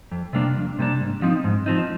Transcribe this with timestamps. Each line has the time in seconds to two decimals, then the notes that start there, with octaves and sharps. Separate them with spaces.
0.12 F2
0.33 C3 G3 A#3 D4
0.56 F2
0.79 C3 G3 A#3 D4
1.00 G#2
1.22 F3 C4 D#4
1.44 G#2
1.66 F3 C4 D#4